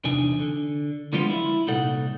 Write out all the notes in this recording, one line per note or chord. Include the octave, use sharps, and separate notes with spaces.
E2 C3 D4 D#4 G#5
D3
D3 F3 G3 G#3 B3 F4
E4
C2 A#2 D#4 A4 F#5